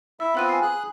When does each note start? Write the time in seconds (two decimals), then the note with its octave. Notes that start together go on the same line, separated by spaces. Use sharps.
0.20 E4 E5 E6
0.35 B3 C4 F4 B5 F#6 D#7
0.49 G#5 C7
0.62 G#4 F#6